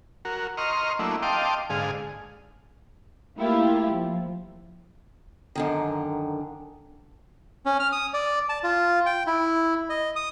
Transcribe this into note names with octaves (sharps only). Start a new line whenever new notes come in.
F#4 A#4
D#5 A#5 C6 C#6 F6
F#3 A3 A#3 D4 E4
D#5 F5 G5 A5 C6 D6
G#2 D3 G#4 F5
A3 A#3 E4 F4 G4
F3
F#2 D3 D#3
C#4
F6
D#6
D5
A5
F4
G5
E4
D#5
D#6